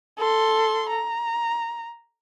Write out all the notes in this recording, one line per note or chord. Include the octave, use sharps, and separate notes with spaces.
A4 C6
A#5